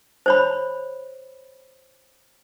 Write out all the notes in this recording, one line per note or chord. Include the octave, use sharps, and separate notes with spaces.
C5 C#5 B5